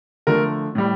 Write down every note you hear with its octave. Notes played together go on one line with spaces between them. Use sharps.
D3 F3 A3 A#4
A2 G3